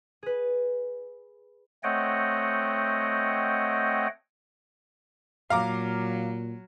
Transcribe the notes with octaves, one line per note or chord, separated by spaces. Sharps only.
G#4 B4
A3 C4 C#5 D#5 F#5 G5
A#2 F#3 F5 A#5 D6